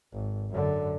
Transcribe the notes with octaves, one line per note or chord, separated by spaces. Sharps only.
G#1
F#2 D3